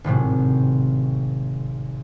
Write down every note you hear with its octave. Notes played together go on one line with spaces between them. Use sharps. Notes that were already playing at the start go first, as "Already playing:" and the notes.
G#1 A2 C3 F#3